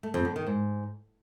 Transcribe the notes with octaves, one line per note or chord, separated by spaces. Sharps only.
A3
F2
D3
D#3
G#2